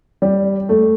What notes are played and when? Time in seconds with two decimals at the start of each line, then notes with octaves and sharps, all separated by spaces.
0.22 G3
0.69 A3